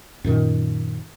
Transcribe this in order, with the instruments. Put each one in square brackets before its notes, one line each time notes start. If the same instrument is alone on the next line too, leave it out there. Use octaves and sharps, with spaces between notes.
[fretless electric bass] F#2 A#2 D#3